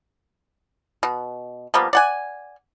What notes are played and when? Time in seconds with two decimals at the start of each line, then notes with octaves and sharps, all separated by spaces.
1.03 B2
1.74 F3 G3 A#3 B3
1.93 D5 F#5 G#5